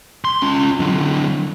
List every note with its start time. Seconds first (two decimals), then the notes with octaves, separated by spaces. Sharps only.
0.25 C6
0.42 C#4 F4
0.80 D3 F#3